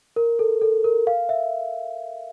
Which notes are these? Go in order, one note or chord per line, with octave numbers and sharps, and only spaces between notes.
A#4
A4
A4
A#4
F5
E5